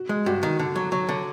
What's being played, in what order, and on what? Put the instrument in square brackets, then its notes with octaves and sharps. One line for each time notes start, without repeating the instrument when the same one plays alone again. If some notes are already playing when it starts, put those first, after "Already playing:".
Already playing: [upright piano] F#4
[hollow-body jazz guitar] G#3
[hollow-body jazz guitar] G2 [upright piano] F#4
[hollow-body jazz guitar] D#3
D3
F#3
F#3
D3